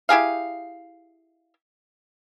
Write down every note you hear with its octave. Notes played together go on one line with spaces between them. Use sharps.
E4 G4 G#4 F5